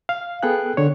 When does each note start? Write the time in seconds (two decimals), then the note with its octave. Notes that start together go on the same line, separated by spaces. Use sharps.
0.09 F5
0.43 B3 G#4 A4 G5 F#6
0.77 D3 C#5